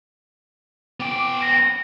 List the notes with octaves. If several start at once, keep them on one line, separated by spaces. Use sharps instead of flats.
B3 G5 D6
A#6